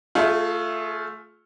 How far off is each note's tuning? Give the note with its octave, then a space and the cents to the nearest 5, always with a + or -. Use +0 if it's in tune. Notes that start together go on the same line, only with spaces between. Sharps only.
A3 +0 F4 +0 G#4 +35